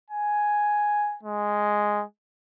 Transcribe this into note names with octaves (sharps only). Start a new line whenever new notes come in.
G#5
G#3